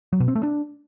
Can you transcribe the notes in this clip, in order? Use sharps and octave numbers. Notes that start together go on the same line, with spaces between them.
F#3
B2
C4
A3
D4